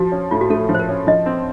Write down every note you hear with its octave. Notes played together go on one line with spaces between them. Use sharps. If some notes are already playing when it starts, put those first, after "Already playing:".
Already playing: F3 F#4
C#4
A2 F4
F#4
A3 A4
F3
C5
A#4
C#4
F3 D#5
C4